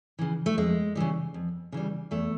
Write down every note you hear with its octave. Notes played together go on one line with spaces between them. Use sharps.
C#3 E3
A3
F2 G#3
C#3 E3 G3
F2
C#3 E3 G3
E2 A3